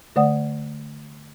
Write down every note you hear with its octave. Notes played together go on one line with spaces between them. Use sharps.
D3 A3 D5 F#5 D#6